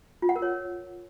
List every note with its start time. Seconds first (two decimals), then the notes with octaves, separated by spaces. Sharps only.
0.22 F4
0.29 F#5
0.36 A#4
0.42 C#5